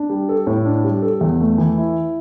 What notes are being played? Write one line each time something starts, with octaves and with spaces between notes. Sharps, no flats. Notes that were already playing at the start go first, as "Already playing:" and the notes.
Already playing: D4
G3
A4
A2
D4
G3
A4
E2
A3
E3
E4